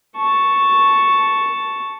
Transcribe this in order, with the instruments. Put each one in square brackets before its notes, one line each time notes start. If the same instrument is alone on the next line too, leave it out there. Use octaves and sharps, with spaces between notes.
[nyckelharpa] A5 C#6